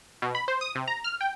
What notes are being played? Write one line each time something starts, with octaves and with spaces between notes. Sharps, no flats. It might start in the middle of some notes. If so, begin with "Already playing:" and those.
B2
B5
C5
D#6
C3
A#5
F6
G5